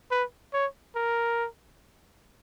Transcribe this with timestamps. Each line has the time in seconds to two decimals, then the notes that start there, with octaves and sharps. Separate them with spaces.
0.11 B4
0.53 C#5
0.95 A#4